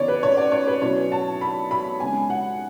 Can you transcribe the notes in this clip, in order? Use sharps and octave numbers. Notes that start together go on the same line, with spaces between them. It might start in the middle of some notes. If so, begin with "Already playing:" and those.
Already playing: C#3 E3 B3 C#5 D5
B4
C#5
D5
C#5
B4
B2 F#3 C#4 E4 C#5
A5
B5
B5
C#3 G#3 B3 G#5
F#5